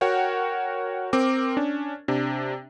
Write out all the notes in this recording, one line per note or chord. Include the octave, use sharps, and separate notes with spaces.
F#4 A#4 C#5 F#5 G5
C4 A#4 D6
C#4 D4
C3 D4